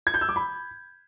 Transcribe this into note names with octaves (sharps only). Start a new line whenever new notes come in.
G#6
G6
E6
D6
B5